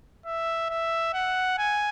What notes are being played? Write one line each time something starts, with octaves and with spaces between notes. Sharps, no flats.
E5
E5
F#5
G#5